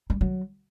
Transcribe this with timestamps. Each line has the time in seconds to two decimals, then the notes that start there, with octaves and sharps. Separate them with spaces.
0.10 G3
0.21 F#3